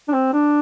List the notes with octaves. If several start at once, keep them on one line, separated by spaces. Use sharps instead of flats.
D4
C4
D4